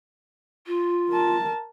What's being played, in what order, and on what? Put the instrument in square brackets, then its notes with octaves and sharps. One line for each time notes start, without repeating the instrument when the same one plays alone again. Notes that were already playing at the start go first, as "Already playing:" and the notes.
[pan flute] F4
[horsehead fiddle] A#4 A5